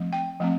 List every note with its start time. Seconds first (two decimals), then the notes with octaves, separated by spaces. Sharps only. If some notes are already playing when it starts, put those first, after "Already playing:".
Already playing: F3 A3 C4
0.13 G5
0.40 F3 A3 C4